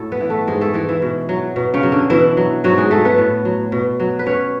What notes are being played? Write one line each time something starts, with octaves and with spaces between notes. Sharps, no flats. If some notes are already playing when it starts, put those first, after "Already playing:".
Already playing: A2 F#3 A3 A4
B3 B4
E3
A3 A4
G#2 G#3 G#4
A3 A4
E3 G#3 G#4
E3 E4
B2
F#3
B2
C#3 C#4
F#3
D3 D4
B2 E3 E4
F#3
G#2 F#3 F#4
G#3 G#4
F#3 A3 A4
B3 B4
A2
F#3
B2
F#3
B4
B2 C#4 C#5